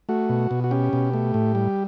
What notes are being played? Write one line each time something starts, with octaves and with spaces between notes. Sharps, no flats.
A3 F#4
B2
B2
F#4
C#4 G4
B2
A3
A2
G3